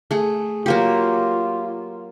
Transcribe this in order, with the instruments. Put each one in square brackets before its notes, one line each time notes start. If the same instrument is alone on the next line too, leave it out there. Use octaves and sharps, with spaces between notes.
[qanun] A3 G#4
[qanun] F#3 A#3 G4 [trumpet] F4